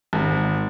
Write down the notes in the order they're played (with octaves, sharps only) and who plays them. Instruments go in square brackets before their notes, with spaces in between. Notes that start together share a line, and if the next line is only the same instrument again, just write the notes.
[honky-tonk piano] G#1